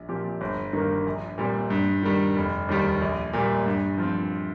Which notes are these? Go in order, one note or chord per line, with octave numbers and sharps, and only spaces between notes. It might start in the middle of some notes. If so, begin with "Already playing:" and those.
Already playing: A#1
A#2 F3 C4 G4
G1
G2 D#3 A#3
A#1
A#2 G3 C4
G2
D#3 G3
F1
D#2 D#3 G3
A#1
A#2 G3
G2
F3 C4